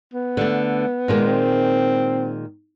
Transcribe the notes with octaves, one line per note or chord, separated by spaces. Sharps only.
B3
D3 A3
A#2 D#3 G#3
C4